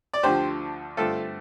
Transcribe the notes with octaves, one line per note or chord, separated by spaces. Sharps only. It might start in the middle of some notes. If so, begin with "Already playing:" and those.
D5
D2 D3 F3 G4 C5
G2 D3 A3 C4 F4 A4